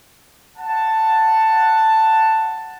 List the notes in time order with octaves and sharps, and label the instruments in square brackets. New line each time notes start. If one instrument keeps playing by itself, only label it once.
[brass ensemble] F#5 A5